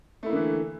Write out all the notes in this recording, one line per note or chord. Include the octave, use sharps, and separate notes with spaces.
D3 E3 A3 A#3 E4